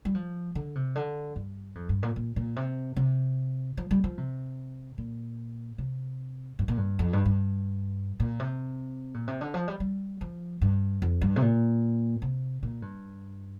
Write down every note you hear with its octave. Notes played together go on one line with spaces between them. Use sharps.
G3
F3
D3
C3
D3
G2
F2
G2
A#2
A#2
A#2
C3
C3
F3
G3
F3
C3
A#2
C3
G2
A#2
G2
F2
G2
G2
A#2
C3
A#2
C3
D3
F3
G3
G3
F3
G2
F2
G2
C3
A#2
C3
A#2
G2